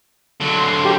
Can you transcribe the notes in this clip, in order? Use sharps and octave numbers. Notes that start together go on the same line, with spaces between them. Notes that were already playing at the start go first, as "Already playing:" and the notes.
D3 F#3
C6
G4